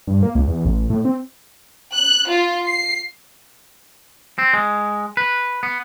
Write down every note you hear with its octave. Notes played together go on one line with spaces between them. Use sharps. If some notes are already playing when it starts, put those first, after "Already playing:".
G2
A#3
C#2
E2
A1
A2
C4
F#6
F4
C7
C4
G#3
B4
B3